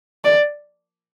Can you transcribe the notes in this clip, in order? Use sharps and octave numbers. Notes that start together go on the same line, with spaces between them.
D5